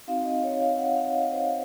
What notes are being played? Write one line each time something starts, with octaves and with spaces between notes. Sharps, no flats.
C4 D#4 F#4 F5
D#5
C#5
F5
F#5
F5
D#5
C5